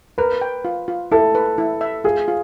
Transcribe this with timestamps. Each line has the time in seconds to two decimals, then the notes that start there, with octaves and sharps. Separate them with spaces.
0.18 A#4 B4
0.42 G5
0.65 F4
0.88 F4
1.12 E4 A4
1.35 B4
1.58 E4
1.81 E5
2.04 F4 G#4
2.28 F4